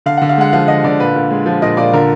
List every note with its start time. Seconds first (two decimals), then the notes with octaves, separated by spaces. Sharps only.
0.06 D3 F5
0.17 D3 F#5
0.29 F5
0.37 G#3 F#5
0.53 F3 F5
0.68 D3 D#5
0.84 D3 D5
1.00 A#2 B4
1.15 A#2
1.31 G#3
1.46 F3
1.62 A#2 D#5
1.77 A#2 D5
1.93 D3 A#4